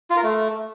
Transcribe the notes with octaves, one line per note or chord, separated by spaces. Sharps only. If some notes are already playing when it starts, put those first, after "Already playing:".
F4
A#4
A3